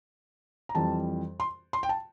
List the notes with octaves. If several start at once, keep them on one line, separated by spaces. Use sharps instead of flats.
A#5
F2 E3 G3 A5
C6
C6
G5
A5